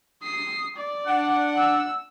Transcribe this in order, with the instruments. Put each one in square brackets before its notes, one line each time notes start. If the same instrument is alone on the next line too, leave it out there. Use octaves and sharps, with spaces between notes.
[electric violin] D#6 C7
D5
[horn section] D4 F#5
[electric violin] E6